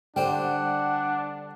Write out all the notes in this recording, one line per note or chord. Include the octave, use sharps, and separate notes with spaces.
D3 G3 D4 C5 F#5 G5